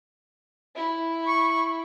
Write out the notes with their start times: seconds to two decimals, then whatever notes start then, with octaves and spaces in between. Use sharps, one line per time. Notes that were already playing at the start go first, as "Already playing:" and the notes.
0.75 E4
1.26 C#6